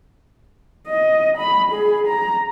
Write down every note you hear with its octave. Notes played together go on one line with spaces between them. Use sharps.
D#5
B5
G#4
A#5